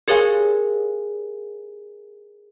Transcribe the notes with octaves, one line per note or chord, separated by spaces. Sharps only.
G4 G#4 A#4 C#5 F5 G#5